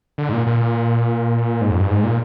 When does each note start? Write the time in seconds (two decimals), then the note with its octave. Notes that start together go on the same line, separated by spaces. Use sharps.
0.18 D3
0.29 G#2
0.33 A#2
0.47 A#2
1.61 G#2
1.70 F2
1.80 G2
1.90 G#2
2.04 A#2